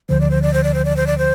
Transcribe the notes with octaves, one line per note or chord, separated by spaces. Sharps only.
D2 D3 F3 C5
D5
C5
D5
C5
D5
C5
D5
C5
D5
C5